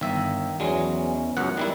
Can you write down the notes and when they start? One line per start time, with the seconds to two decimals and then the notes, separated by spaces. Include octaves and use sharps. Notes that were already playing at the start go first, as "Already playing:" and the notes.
0.01 G1 D#3 E5
0.60 E2 E3 F#3 G#3 C#4
1.37 C#2 F#2 F#5
1.57 D#3 G3 E4